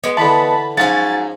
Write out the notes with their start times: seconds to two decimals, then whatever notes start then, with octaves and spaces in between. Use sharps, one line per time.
0.04 G#3 B3
0.17 D3 E3 A5 B5
0.77 G#2 F3 F#3 C#4 G#5 A6